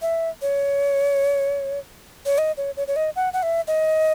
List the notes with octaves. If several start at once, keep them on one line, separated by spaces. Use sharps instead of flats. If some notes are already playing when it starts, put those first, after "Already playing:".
E5
C#5
C#5
D#5
C#5
C#5
C#5
D#5
F#5
F#5
E5
D#5